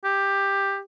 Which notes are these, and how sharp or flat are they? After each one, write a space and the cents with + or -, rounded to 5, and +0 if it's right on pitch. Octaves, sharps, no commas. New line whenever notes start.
G4 +10